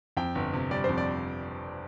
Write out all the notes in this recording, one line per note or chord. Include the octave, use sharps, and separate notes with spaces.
F2 G5
G1
C3
G3 D5
F2 C5
D5